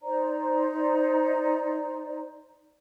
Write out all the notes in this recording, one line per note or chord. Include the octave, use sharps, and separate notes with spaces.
D#4 C5 D5 A#5